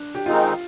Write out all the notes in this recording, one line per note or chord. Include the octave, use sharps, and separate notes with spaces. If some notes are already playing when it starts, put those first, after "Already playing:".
Already playing: D4
G4
D#3 G#3 C4 D#4 F4